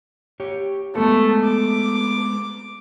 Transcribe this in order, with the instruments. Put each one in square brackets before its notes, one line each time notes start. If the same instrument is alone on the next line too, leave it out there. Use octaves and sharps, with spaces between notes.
[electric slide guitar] G4 C#5
[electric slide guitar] G#3 B3 A4 [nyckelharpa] A3
[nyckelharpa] D6